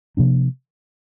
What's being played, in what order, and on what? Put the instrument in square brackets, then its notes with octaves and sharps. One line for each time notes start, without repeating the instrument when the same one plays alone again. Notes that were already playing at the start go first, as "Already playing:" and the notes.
[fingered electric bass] C3 F3 A#3 D4